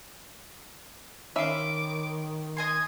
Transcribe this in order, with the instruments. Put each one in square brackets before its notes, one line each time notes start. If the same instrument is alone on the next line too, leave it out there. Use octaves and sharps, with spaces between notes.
[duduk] D#3 [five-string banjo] C#4 E5 F5 [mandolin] B5 C6 [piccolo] D6
[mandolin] D#5 G#5 C6 [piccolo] G#6